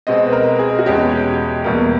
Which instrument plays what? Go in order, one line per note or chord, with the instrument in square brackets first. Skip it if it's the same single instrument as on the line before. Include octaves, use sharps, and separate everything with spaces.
[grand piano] B2 G#3 C4 D#5
B4
A#4
G#4
F#4
E2 B2 G#3 C#4 G4
E2 B2 G3 A#3